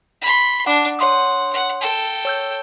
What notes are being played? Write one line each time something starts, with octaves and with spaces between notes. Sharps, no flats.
B5 C6
D4 F#5 D6
C#5 F#5 C6 D#6
F#5
A4 G5
C#5 E6 G6